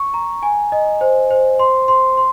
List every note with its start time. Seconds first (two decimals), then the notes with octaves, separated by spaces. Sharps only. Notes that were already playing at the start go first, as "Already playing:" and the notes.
Already playing: C#6
0.14 A#5
0.43 G#5
0.72 D#5
1.01 C5
1.31 C5
1.59 C6
1.88 C6
2.17 C6